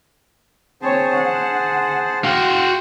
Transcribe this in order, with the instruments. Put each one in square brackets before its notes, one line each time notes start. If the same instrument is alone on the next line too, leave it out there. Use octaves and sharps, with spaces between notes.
[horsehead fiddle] C4 C#5 [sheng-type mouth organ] G#4 C5 A5
[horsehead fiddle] F#5
[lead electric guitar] F#4 F5 [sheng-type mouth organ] G5 C6